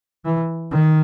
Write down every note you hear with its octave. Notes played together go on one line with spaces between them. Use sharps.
E3
D#3